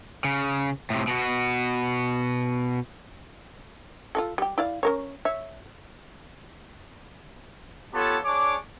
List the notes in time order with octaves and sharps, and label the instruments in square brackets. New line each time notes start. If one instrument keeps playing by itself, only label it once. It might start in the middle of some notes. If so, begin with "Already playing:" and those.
[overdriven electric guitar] C#3
A2 C3
B2 F#4
[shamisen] F4 F#4 A4
G3 G4
E4 D5 F5
C#4 A#4 C#5
C#5 E5
[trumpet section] B3 F4 G4 A4 C#5 A5
D4 G#4 C#5 D6